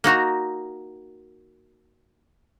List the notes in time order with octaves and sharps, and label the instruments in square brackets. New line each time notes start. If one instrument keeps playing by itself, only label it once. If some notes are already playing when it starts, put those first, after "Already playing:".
[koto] A#3 D#4 F#4 A#5